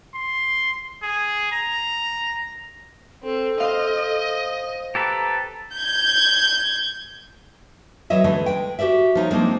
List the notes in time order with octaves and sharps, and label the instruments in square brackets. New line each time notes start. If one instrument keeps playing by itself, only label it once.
[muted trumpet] C6
G#4
A#5
[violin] C4 [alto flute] A4
[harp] C5 F5 [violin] D#5
[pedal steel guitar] G4 A4 B4 [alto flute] A#5
[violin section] G6 G#6
[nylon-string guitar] E3 F#3 C#5 D#5 E5
D3 E3 G#3 A3
G#3 B4 G5
F#4 G4 A#4 D5 E5
F3 D#4 C#5
F3 G#3 A#3 C4 D4 D#4